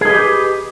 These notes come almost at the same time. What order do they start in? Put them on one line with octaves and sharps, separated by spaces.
G#4 D#5 B4 G4